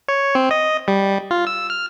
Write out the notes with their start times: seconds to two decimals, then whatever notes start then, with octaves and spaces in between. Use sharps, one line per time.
0.08 C#5
0.35 C4
0.51 D#5
0.88 G3
1.31 F4
1.47 E6
1.70 F6